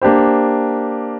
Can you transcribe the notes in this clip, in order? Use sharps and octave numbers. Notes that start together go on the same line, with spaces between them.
A#3 D4 G4 C5